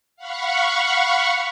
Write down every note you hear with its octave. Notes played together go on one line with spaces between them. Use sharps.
F5 F#5 B5 C#6